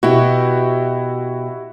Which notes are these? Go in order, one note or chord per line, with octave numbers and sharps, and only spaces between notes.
B2 E4 F#4 G4